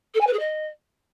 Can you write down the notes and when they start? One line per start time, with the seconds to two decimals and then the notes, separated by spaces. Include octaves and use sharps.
0.14 A4
0.20 G#5
0.27 B4
0.33 G#4
0.39 D#5